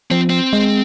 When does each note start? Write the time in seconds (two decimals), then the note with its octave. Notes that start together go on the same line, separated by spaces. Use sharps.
0.11 F3 C4
0.30 C4
0.53 G#3